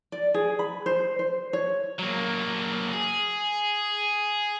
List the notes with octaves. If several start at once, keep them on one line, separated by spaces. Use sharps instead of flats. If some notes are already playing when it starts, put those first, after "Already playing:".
D5
G#4
B5
C5
C5
C#5
F#3 A#3
G#4